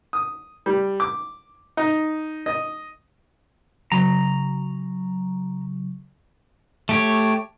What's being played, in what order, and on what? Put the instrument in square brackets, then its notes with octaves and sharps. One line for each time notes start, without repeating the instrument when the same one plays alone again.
[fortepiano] D#6
G3
D6
D#4
D#5
[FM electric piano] C#3 F#3 [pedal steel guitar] A#5
[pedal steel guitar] A3 G4 C#5